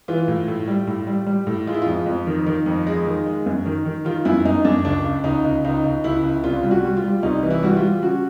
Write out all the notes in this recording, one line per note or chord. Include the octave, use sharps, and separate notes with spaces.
E3 F4
A2
A2
G3
A2
G3
G3
A2
G#3 F4
E4
F2 F4
F2
D#3
D#3
F2
G#3
D#3
G#3
F#2
D#3
D#3
D#3 F4
F#2 E4
F#2 D#4
F#2 D4
C#2 D4
C#2
C#2 D#4
C#2
C#2 D#4
C#2
C#2 E4
C#2
C2 F4
G3
F#4
G3
F4
G3
C2 D#4
E3
E4
G3 F#4
F4
G3
C#3 F#4